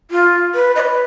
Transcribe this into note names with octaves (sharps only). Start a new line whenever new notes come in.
F4
B4
D#5
B4